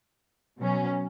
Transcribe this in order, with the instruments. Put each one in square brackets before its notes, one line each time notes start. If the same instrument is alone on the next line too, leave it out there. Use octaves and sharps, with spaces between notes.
[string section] B2 F#3 C#4